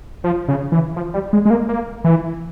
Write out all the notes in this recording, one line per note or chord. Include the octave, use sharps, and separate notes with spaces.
F3
C#3
E3
F3
G3
G#3
G#3
A#3
A#3
E3